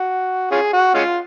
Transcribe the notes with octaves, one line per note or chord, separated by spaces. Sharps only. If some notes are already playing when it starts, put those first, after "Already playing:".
Already playing: F#4
C#4 F4 G#4
F#4
G#3 C#4 F4